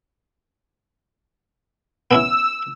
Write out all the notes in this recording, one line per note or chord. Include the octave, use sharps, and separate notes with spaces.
B3 C#4 E4 E6